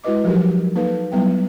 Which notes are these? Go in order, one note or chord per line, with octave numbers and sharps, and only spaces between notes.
G#3 E4 F#4 B4 D#5 D6
F3 F#3 D#4 F#4 G4 A#4
A#3 D#4 A4 B4 F5
F#3 G3 B3 E4 B4 G5